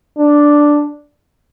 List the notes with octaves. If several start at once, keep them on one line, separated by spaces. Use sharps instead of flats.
D4